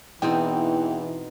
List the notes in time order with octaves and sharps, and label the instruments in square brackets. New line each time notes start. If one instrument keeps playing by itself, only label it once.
[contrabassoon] E2 [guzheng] B2 C4 D#4 [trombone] E3 [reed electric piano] G5